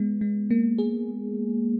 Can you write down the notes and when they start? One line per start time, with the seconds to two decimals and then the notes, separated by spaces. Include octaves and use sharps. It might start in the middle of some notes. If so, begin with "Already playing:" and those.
Already playing: G#3 B3
0.21 G#3
0.50 A#3
0.78 G#4